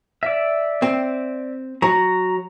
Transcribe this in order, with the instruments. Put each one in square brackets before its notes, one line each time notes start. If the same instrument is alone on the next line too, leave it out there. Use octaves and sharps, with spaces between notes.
[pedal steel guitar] D5 E5
[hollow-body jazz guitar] C4
[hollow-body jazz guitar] F#3 [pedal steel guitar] A#5